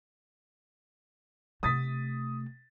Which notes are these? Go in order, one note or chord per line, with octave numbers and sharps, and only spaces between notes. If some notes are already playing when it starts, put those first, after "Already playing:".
C3 A3 D#6 A6 B6